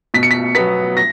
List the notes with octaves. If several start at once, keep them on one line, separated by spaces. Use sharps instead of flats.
B2 B6
C#7
B6
F#3 B3 B6
A#6